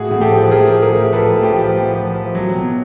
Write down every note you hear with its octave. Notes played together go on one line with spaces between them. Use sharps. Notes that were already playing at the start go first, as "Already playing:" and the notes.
Already playing: A2 F#4 G#4
A2
G4 A4
F3
A2 G#4 A#4
F3
G#4 A#4
A2
F3 A4 B4
A2
G4
F3
A2
F3
F3
F#3
B2